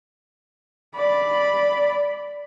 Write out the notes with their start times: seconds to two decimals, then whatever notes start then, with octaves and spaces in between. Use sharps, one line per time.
0.95 D5 B5